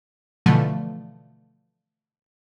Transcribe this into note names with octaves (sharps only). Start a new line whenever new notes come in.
B2 D3 E3 F3 A3